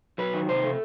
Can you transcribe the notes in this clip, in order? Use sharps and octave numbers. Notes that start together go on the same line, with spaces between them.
F#3 B4
D#3
C3 C5
A3